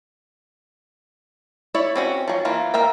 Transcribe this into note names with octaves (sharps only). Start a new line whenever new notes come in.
E4 C#5 D5 E5
C4 C#4 F#4
F3 F#3
E3 A#3 F4
A#3 A#4 E5 G5